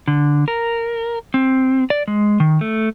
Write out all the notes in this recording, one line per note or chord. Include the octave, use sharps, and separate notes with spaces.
D3
A#4
C4
D5
G#3
D#3
A3